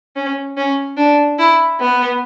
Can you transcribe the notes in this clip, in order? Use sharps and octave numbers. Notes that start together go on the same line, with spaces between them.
C#4
C#4
D4
E4
B3